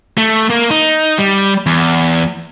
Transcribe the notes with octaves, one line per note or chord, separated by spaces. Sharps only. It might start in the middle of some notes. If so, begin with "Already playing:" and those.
A3
A#3
D#4
G3
E2